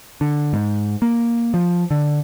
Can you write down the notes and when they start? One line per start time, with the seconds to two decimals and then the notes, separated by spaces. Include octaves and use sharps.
0.21 D3
0.53 G#2
1.02 A#3
1.54 F3
1.91 D3